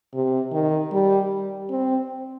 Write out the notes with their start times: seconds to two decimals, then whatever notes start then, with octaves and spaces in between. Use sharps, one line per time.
0.13 C3
0.52 D#3
0.91 G3
1.70 C4